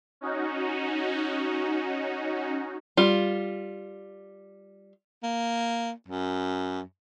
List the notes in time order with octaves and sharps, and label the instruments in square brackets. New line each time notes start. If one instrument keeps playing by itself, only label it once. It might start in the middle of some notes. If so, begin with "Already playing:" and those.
[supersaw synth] C#4 D#4 F#4
[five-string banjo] G3 F4
[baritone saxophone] A#3
F#2